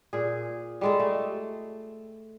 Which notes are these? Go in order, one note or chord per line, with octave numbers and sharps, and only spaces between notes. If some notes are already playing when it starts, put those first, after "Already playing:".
A#2 G#4
G3 G#3 A4
A3